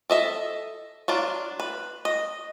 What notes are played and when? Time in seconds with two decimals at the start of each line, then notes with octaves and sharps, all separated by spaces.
0.10 A4 D#5 E5
1.08 F#3 D4 F4
1.60 B4
2.05 D#5